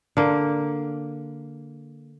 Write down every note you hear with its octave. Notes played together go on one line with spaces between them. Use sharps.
D3 A#3